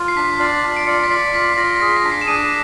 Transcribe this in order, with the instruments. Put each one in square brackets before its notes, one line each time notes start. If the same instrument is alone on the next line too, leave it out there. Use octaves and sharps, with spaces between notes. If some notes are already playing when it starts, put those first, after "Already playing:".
Already playing: [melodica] F4
[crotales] C7
[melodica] D4 [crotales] B6
[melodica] D5
F4
[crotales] D7
[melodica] D5 [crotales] C#7
[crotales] B6
[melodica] D5 [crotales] C7
[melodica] F4 [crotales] B6
[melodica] F4 [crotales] A#6
[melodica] G#4 [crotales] A#6
[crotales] B6
[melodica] D4
[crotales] C7
E7
[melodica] D4 [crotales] D#7